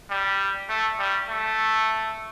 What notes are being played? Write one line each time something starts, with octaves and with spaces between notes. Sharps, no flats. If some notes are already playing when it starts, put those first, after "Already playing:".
G3
A3
G3
A3